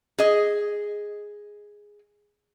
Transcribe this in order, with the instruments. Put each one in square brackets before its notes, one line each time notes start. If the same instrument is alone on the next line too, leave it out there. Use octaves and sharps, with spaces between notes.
[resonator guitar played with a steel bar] G#4 D#5